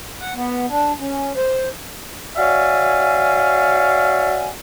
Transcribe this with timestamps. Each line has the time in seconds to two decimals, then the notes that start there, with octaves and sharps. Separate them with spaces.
0.20 F#5
0.35 B3
0.69 D4
0.99 C#4
1.36 C5
2.36 F#4 C#5 D5 E5 F5 G#5